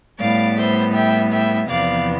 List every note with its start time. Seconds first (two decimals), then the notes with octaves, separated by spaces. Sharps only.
0.19 A2 G3 B3 D5 F5
0.57 C5 E5
0.95 E5 G5
1.32 E5 G5
1.69 E2 C3 F3 B3 D5 F5